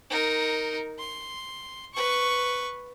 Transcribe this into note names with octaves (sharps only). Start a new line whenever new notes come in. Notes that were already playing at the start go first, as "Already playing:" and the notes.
D#4 A#4
C6
B4 C#6